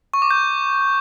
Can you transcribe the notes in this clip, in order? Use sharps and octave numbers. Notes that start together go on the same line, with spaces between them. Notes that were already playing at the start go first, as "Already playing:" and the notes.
C#6
D6
G6